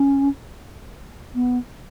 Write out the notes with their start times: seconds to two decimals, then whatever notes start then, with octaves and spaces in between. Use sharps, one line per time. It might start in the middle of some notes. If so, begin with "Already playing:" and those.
Already playing: C#4
1.35 B3